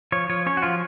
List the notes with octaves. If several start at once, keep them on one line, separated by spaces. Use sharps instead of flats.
F3 C#5
F3 C#5
C#4 C#5
F#4
F3 F4